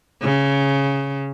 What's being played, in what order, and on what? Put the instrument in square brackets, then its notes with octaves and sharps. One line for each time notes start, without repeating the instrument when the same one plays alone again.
[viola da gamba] C#3